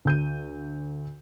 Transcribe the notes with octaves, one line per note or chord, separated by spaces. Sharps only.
D2 G6 D#7